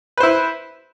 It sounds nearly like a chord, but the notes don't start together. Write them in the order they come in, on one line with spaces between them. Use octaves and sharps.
B4 C5 E4